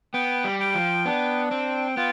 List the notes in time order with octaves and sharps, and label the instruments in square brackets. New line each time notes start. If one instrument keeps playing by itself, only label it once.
[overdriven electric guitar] B3 [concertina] G5
[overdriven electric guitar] G3
[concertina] G5
[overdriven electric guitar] F3
[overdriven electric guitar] B3 [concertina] D4
[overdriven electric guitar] C4 [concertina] G5
[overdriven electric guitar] B3 [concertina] F4